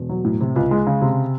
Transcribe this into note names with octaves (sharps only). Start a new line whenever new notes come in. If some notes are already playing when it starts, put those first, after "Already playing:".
Already playing: E1
F#3
A2
C3
C#2
G#3
C#3
C3